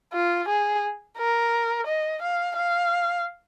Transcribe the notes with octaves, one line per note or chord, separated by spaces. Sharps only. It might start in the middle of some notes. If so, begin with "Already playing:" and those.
F4
G#4
A#4
D#5
F5
F5